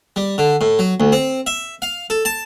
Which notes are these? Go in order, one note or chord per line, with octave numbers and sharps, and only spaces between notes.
G3
D3
A2
F#3
D2
C4
E5
F5
A4
A5